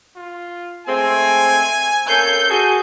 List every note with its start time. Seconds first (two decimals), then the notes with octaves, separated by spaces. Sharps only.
0.16 F4
0.87 G#3 A3 C4 G#5
2.09 A#3 C#4 A4 G6
2.49 F#4 G#4 A4